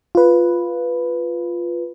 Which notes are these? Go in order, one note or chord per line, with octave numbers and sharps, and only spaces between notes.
F4 B4